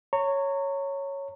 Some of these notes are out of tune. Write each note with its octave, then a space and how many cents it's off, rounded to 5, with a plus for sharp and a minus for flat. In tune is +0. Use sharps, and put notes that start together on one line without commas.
C#5 +0 A#5 -30